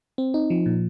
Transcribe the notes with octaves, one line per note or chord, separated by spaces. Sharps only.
C4
D#4
F3
A#2